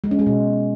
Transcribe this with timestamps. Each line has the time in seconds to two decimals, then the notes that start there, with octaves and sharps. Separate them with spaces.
0.04 G#3
0.11 C#4
0.19 G#3
0.26 B2